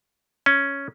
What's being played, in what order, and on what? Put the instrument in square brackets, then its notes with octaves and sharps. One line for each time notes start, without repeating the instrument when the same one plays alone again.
[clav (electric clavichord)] C#4